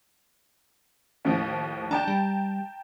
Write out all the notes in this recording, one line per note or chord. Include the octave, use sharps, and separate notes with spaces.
D#2 A2 F3
D4 G5 A5 A#5
G3